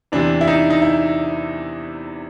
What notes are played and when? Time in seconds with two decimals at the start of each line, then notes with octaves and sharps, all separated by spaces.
0.12 E2 C3 E3 D4
0.41 E4
0.48 D#4
0.70 D#4
0.82 E4